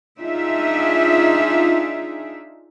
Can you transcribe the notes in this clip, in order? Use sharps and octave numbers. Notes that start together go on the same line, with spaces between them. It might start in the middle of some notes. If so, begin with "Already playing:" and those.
D4 D#4 F4 G#4 E5